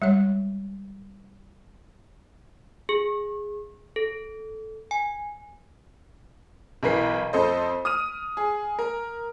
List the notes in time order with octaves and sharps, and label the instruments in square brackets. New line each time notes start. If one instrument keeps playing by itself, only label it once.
[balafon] G3 G#3 C#5
[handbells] G#4
A4
G#5
[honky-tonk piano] B1 E3 A#4 B4 C7
F2 A4 C5 D#5
D#6 F6 D#7
G#4
A#4